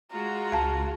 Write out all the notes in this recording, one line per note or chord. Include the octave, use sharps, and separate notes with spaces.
G#3 F4 F#4 A#5
C#2 F5 A5